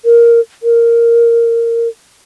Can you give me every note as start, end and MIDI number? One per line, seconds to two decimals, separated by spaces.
0.05 0.40 70
0.63 1.88 70